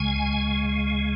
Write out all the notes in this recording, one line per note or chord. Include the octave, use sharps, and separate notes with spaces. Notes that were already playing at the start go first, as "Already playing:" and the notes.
Already playing: C#2 C#3 G#3 G#5